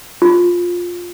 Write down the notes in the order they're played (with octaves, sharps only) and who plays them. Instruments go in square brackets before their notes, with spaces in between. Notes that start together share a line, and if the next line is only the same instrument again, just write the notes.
[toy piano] F4